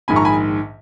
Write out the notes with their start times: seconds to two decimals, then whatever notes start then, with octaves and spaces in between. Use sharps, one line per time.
0.08 A#1 G#2 D#3 G#5 B5
0.16 A#5 C#6
0.25 G#5 B5